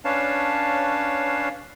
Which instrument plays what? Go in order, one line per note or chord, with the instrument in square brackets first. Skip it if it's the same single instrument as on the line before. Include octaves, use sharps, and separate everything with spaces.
[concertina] C#4 D4 B4 C#5 F5 A5